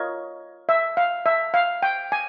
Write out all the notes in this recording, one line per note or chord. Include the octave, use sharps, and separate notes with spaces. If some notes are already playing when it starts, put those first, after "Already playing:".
Already playing: F4 A#4 C#5 D#5
E5
F5
E5
F5
G5
G#5